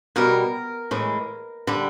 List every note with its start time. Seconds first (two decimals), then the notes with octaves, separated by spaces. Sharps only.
0.16 B2 G3 A#4
0.91 A2 E3 G#3
1.67 D3 G3